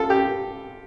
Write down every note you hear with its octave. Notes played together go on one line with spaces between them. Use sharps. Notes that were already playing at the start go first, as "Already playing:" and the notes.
Already playing: F4 A4
G4